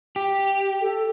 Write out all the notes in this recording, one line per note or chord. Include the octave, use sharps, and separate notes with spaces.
G4
A4